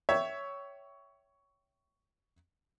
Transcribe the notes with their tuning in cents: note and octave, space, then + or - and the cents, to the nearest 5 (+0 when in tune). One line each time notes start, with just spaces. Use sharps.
C#5 +10 E5 +0 G5 -20